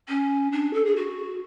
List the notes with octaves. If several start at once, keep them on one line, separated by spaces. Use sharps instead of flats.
C#4
D4
A4
G#4
F#4